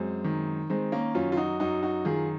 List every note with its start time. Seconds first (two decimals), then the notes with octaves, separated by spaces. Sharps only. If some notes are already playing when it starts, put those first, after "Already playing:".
Already playing: F#2 G#3 C4
0.24 D#3
0.70 D#3 G#3 C4
0.92 A#3 C#4
1.15 F#2 C#4 F4
1.32 F4
1.37 D#4 F#4
1.60 F#2 D#4 F#4
1.83 D#4 F#4
2.05 D#3 F4 G#4